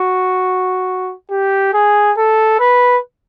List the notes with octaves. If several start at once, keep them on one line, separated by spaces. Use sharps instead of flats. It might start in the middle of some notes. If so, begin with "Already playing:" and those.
Already playing: F#4
G4
G#4
A4
B4